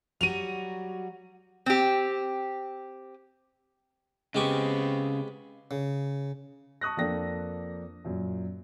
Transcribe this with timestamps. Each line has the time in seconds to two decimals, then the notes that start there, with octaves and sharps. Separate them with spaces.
0.21 F#3 G3 F#4 D#7 F7
1.66 C4 G4
4.35 C#3 G#3 B3 C4 G4 C#6
5.71 C#3
6.81 A5 C#6 D#6 F#6 A#6
6.97 F2 A#3 D4 A4 G5 A#6
8.04 F#2 A#2